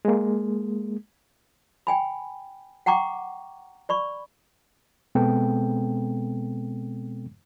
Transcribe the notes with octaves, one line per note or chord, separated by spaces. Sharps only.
G#3 A#3
G5 G#5 B5
F#5 G5 A#5 C#6 D6
D5 B5 C#6
B2 G#3 B3 C4 A4 G5